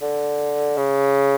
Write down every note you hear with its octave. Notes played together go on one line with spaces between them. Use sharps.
D3
C#3